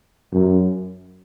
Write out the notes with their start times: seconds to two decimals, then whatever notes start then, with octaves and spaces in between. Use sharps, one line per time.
0.32 F#2